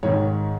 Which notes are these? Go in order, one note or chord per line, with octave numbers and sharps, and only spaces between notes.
G#2 D#3 C#5